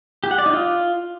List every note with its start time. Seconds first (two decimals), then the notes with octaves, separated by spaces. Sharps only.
0.24 G4
0.31 F#5
0.38 D5
0.46 D#4
0.53 F4